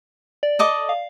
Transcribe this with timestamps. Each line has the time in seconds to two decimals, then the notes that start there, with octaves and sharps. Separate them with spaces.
0.43 D5
0.59 A4 D#5 D6
0.89 F5